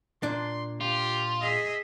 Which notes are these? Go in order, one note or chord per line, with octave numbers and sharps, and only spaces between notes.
A#2 D4 C6
F4 G4
G#4 D#5 E5